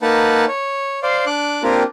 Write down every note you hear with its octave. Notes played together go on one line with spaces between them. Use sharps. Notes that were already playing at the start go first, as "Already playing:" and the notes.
A#3 D#4 B4 F#5 A5
C#5
C5 D5 F5
D4 D6 F#6
A#3 C4 D4 F4 G4 A#4